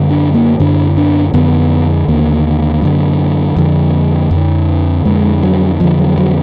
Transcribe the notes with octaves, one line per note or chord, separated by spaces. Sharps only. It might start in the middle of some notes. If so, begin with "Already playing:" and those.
Already playing: F#2 D3
D4
A#3
F#2 D3 D4
D4
F2 D3 B3
D#2 D3 A#3
F#2 D3
F2 D3
F2 D3
F2 D3 G#3
F#3
F2 D3 F3
F#3
F#3